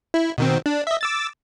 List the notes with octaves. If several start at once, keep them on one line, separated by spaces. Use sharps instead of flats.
E4
B2 D#3 C4
D4
D#5 E5
D6 E6 A6